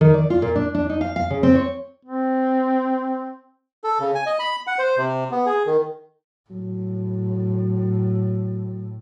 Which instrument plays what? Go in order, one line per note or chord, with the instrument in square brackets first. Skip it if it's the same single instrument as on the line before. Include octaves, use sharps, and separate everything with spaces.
[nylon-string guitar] D#3
D5
F4
A#2
D4
D4
D#4
F5
F5
C#3
C4
C#5
[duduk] C4
[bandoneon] A4
C#3
G#5
D#5
B5
F#5
C5
C3
B3
G#4
D#3
[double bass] A2 [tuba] F#3